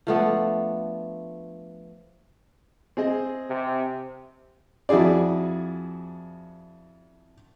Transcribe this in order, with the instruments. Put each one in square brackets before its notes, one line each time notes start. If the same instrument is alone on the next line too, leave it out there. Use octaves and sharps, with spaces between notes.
[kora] F3 A3 B3 D4
[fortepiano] C4 G#4 D#5
[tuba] C3
[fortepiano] F2 E4 F#4 G#4 D5